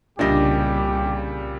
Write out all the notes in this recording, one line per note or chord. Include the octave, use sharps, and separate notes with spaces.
C2 A#2 C#3 G3 D4 G4 D#5